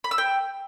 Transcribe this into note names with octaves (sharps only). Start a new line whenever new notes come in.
B5
E6
G5